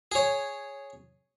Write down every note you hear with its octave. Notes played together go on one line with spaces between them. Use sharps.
G#4 C#5